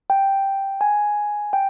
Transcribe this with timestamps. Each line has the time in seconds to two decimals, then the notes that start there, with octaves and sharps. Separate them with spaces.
0.10 G5
0.81 G#5
1.53 G5